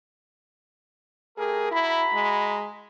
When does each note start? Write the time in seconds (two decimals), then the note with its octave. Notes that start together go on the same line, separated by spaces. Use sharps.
1.37 A3 G4 G#4 A#4
1.71 E4 F#4 A#5 B5
2.14 G#3